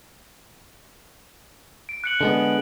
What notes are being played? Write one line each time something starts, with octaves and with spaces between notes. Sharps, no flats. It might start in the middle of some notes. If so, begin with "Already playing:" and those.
D7
F#6 C#7 F#7
D3 G#3 B3